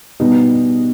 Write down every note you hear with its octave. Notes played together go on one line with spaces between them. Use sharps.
B2 G3 B3 D#4